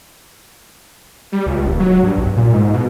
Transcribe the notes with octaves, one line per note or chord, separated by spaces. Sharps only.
G3
C#2
D#1
F#3
G2
B1
A#2
G#2
B2